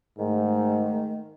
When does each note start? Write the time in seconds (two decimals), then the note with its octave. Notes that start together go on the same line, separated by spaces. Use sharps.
0.18 G#2 D#3 A3